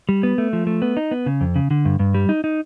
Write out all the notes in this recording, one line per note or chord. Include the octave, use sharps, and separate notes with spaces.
G3
B3
A3
F3
A3
B3
D#4
B3
C#3
F2
C#3
D3
G2
G2
G3
D#4
D#4